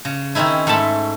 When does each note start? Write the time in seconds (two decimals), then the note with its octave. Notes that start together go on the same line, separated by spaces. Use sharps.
0.05 C#3
0.35 D#3 C4 C#4 D#4 E4
0.67 G#2 A3 E5 A5 B5